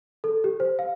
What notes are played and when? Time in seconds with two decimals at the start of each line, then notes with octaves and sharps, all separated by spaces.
0.24 A4
0.44 G4
0.60 C5
0.79 F5